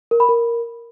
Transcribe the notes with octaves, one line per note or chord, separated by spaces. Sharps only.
A#4
B5
A#4